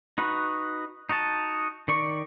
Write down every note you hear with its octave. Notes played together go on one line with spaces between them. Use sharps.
D#4 F#4 B4
D#4 F#4 D#5 A5
D#3 D5 C#6